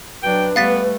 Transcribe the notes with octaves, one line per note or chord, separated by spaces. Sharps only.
F#3 D4 B4 G5
G3 A3 B3 F5 A6 B6